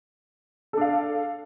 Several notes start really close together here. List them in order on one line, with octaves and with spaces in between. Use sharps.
A4 D4 F5